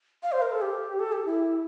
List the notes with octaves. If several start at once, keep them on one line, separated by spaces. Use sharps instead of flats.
F5
C5
A#4
A4
G4
A4
G4
E4